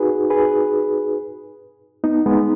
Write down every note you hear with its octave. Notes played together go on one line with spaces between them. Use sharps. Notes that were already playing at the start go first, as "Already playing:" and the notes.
Already playing: D#4 F#4 G#4 B4
G#4 B4
B3 D#4
G#3 B3